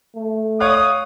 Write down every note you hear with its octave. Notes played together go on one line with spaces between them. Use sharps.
A3
C#5 F5 D#6 F#6